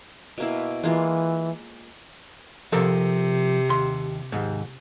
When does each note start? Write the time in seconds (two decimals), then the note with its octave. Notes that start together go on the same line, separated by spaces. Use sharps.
0.38 B2 A#3 E4
0.83 E3 G#3 A#3 F4
2.72 C3 F3 A4 A#4
3.69 D#2 C6
4.32 D#2 G#2